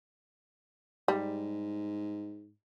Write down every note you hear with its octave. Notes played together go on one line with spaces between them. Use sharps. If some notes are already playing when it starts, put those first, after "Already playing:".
G#2 G3